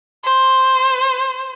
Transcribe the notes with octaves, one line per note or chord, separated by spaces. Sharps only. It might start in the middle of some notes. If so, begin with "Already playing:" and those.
C5